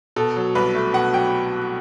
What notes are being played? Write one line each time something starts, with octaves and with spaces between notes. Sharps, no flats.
B2 A4
F#3
C2 B4
A3
B2 F#5
F#3 G5